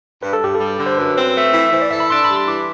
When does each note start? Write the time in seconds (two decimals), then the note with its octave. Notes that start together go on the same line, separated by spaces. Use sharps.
0.22 G2 B4
0.33 A4
0.42 G2 G4
0.55 A4
0.60 G3
0.79 D3
0.86 C5
0.98 F#2 B4
1.16 C4
1.35 A3
1.54 E3
1.72 E3 C5
1.82 D5
1.91 A4 E5
2.00 B5
2.10 D4 C6
2.24 G3 B5
2.36 C6
2.48 E3 D6